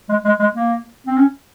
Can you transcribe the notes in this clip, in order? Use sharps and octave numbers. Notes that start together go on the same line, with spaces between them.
G#3
G#3
G#3
A#3
C4
C#4